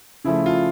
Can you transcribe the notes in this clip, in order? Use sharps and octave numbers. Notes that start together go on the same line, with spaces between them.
C#3 F3 A3 E4
F4